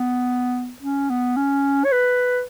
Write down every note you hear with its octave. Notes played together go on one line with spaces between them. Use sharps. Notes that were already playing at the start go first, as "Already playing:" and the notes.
Already playing: B3
C#4
B3
C#4
C#5
B4